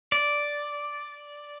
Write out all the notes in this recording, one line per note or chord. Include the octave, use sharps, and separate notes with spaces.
D5